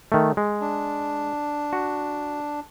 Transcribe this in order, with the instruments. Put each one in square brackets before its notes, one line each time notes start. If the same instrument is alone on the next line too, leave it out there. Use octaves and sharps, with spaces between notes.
[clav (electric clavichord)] D#3 A3
G#3
[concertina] D4
[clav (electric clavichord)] F#4